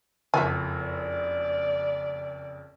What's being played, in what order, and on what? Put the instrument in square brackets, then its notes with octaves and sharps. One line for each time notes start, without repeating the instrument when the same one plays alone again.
[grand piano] F#1 F2 [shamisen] E5 G#5
[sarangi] D5